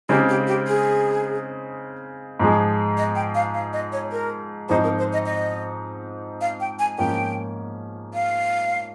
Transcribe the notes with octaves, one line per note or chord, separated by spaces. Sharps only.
C#3 G#3 C4 D#4 G4
G4
G4
G#4
G#2 F3 G#3
D#5
G5
F5
F5
D#5
C#5
A#4
G#2 F3 C4 D#4 C5
A#4
C5
D#5
D#5
F5
G5
G#5
G#2 F3 A#3 C#4 G5
F5